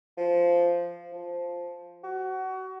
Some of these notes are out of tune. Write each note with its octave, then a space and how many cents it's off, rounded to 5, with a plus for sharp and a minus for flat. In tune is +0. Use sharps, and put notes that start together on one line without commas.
F3 -10
F3 +0
F#4 +25